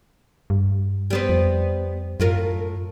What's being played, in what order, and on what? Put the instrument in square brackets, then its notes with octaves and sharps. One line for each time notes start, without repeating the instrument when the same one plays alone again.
[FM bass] G2
[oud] G3 B3 C4
[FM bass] F2
[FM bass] F#2 [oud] A2 F4 A#4